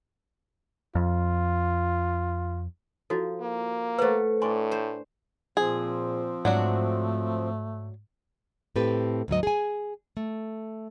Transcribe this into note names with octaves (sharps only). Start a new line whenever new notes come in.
F2 F4
F3 E4 F#4 A4
A#3
A3 B4 C5 F#5
A2 D4 G#5 C6 C#6
C5
A#2 F3 C4 G#4
G#2 F#3 A3 D4 F#4
A2 C4 G4 A4 B4
D2 G#2 F#3 D#5
G#4 G#5
A3